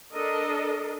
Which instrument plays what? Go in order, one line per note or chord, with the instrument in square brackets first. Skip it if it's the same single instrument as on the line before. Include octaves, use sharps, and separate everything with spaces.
[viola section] D4 A4 A#4 D#5